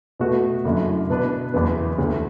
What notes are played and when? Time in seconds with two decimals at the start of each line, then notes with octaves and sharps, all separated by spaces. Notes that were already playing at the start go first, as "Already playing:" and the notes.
0.19 B2 A3 F#4 B4
0.65 F#1 F#2 D3 A3 E4
1.10 B2 B3 D4 B4
1.54 F#1 E2 E3 B3
1.98 D2 D3 A3